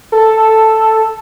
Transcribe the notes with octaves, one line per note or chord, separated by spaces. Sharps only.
A4